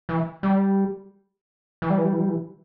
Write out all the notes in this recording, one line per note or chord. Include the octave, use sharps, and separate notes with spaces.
E3
G3
E3
G3
E3
G3
E3
G3
E3